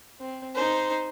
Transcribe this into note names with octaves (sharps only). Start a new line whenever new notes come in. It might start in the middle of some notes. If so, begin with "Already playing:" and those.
C4
D#4 C5